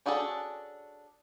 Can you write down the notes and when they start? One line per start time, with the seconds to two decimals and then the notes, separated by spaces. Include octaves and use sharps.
0.06 C#4 D4 F#4 G#4 A4